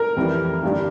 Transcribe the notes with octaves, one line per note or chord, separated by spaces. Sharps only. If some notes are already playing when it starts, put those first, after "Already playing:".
Already playing: A#4
F2 E3 G3
G2 D3 G3 D4